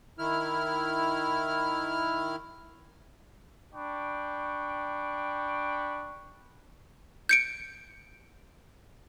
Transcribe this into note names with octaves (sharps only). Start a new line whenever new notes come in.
D#3 E4 F6
D4 G5 B5 C#6
G6 C#7 D7